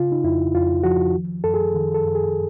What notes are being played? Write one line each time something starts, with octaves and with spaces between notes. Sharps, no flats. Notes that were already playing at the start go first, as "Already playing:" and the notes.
Already playing: C#3 F4
D#4
F2 E4
F2 F4
F3 F#4
D#3
F#2 A4
G#4
D#3
A4
F#2
G#4